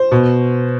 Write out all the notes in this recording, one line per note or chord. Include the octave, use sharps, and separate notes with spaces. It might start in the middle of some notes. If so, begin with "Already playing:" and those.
Already playing: C5
B2